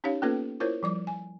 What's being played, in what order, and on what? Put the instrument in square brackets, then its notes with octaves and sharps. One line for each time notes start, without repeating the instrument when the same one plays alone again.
[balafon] C#4 D#4 G4 C#5 F5
A#3 B3 C#4 F4 A4 B4
E4 F4 A#4 C5 C#5
F3 G3 D6
G#5